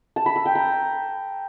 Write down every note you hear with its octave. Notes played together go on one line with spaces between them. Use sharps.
A5
B5
E6
G5
A#5